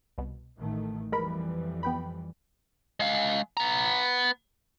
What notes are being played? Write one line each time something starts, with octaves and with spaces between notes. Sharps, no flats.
C2 B2
A1 D#3 A3
F2 E3 G3 G#3 A#4 B5
B3 G5 B5
G#3 F5
B3 A#5